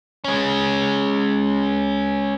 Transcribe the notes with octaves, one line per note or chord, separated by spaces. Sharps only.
G#3 C#4